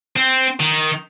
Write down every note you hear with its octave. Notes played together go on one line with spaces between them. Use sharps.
C4
D#3